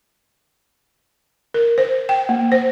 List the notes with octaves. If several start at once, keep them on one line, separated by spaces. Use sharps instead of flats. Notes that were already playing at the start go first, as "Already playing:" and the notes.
A#4
C5
G5
A#3
C5